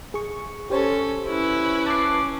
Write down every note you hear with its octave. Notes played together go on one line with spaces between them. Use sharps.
G#4 C#6
C#4 G4 A4 C5 C#5
C#4 E4 B4
A5 D6 F#6 C7